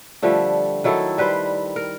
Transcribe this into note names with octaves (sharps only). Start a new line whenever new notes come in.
D3 F3 G3 A3
D#3 F#3 E4 A4
G3 B4 C5
A#4